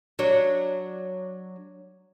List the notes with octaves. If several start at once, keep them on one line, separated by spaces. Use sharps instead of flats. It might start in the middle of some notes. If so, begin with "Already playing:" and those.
F#3 D4 C#5